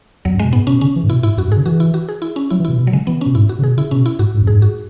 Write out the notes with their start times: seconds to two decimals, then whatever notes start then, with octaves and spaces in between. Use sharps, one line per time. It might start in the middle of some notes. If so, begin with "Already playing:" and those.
0.25 E2 F#3
0.34 F#2
0.39 B2 G#3
0.53 G#2 B3
0.67 B2 C#4
0.81 C#3 C#4
0.96 E3
1.03 G#2
1.09 B2 E4
1.23 G#2 E4
1.37 F#2 F#4
1.48 G#2
1.52 C#3 G#4
1.66 E3 F#4
1.80 E4
1.94 F#4
2.09 G#4
2.22 E4
2.36 C#4
2.50 F#3 E4
2.60 E3
2.65 B2 E4
2.78 B2
2.87 F#3
2.92 C#3 G#3
3.07 E3 B3
3.21 B2 C#4
3.35 G#2 E4
3.49 F#4
3.59 C#3
3.63 B2 G#4
3.77 C#3 E4
3.91 B2 C#4
4.06 E4
4.19 G#2 F#4
4.34 G#2
4.42 F#2
4.47 G#2 G#4
4.62 F#4